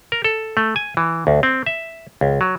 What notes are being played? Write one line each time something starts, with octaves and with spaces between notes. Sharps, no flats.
A#4
A4
A3
G#5
E3
D2
C4
E5
C#2
F#3